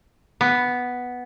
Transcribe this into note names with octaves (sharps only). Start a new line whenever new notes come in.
B3